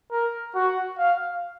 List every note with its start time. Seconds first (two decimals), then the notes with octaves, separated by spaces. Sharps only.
0.12 A#4
0.55 F#4
0.99 F5